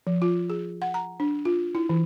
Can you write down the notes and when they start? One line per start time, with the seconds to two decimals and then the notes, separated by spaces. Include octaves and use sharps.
0.07 F3
0.22 F4
0.50 G#4
0.82 F#5
0.94 A#5
1.20 D4
1.45 F4
1.75 E4
1.89 E3